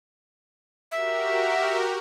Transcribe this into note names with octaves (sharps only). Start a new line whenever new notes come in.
F#4 G4 A#4 E5